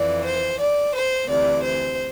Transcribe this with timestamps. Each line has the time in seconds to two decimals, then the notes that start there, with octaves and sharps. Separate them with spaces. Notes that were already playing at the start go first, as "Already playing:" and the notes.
Already playing: F2 E3 D5
0.25 C5
0.59 D5
0.94 C5
1.28 D2 C3 E3 D5
1.62 C5